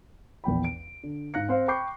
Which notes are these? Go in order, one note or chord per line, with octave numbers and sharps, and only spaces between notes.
A#1 E2 G5 B5
D7
D3
G#2 F5 F#6 A#6 C#7
C4 C5 F5
G5 B5 C#6 D6 G6 C7